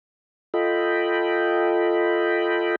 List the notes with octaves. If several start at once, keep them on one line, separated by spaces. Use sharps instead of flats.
F4 A4 D#5 G5 B5